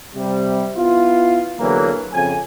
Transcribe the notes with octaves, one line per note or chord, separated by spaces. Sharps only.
C3 G3
B3 E4 F4
E2 D3 E3 F#3 A#3
F2 C#3 G#5